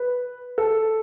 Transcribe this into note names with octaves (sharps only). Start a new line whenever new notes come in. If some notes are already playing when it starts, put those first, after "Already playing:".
Already playing: B4
A4